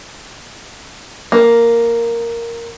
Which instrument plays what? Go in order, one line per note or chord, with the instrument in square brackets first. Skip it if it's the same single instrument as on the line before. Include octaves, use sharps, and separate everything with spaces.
[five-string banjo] A#3